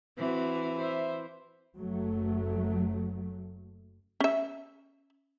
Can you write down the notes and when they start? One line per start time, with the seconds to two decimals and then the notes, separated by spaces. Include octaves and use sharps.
0.18 E3 C4 F#4
0.77 C5 E5
1.76 F#1 F#3 A3
4.20 C#4 E5